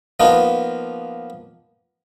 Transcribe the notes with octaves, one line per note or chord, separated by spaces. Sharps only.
F3 A#3 B3 D#4